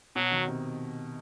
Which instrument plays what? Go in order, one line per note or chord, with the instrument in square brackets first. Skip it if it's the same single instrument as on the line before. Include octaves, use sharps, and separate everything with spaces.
[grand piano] B2 [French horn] F#3
[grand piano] D#3
C3